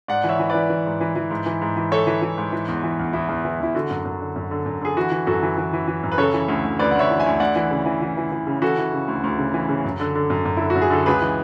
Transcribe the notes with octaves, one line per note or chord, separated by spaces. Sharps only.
G#2 D5 F#5
E3
C#5 E5
E3
E3 B4 D5
E3
G#2
E3
E3
G#2
E3
G#2
E3
E3 A4 C#5
E3
E3
G#2
E3
E2
E3
E2
E2 E4
E2
E3
E2 E4
D3 F#4
F#2
F#2
D3
F#2
D3
F#2
D3 G#4
E3 F#4
E3
F#2 F#4 A4
E3
E3
E3
E3
F#2
B4
C#3 A4 C#5
E3
D2
D2
D2 B4 D5
F#5
D2 C#5 E5
E3
E5 G#5
D2
D2 D5 F#5
E3
C#3
E3
E3
E3
E3
C#3
E3 F#4 A4
E3
C#3
D2
D2
C#3
E3
C#3
F#2
D3
D3
F#2
F#2
D3 E4
F#4
F#2
G#4
D3 A4
C#2 G#4 B4
E3